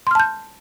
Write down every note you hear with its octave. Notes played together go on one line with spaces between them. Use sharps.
A5 C6 F6 G6